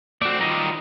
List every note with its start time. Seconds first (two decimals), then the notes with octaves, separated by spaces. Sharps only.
0.22 A3 C4 F#4 D5
0.41 D#3 G3 F4 D#5 A#5